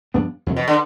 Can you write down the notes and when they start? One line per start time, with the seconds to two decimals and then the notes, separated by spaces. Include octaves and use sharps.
0.14 G2 F3 B3 D4
0.47 F2 C3 F3
0.56 B2
0.68 D3